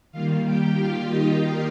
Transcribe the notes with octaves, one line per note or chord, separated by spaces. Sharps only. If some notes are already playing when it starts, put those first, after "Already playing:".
D#3 G3 A#3 F4 F5
G4 G5
F4 F5
D#4 D#5